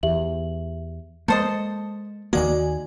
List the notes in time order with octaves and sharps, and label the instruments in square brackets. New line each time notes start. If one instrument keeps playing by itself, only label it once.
[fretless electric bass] E2 [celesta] G4 E5 F#7
[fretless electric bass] G#3 A#3 [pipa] A4 C5 D#5 [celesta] G6 A6 C#7
[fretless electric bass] D#2 D#3 A#3 [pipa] G#3 [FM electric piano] F#4 D5 G#5